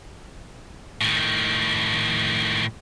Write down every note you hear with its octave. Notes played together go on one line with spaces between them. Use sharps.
A2 D#3